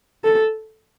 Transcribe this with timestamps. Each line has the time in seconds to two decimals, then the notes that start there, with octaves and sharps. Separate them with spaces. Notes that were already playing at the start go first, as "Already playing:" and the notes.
0.24 A4